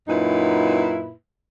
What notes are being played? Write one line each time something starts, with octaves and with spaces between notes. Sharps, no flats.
F#2 A#2 D#4 E4 B4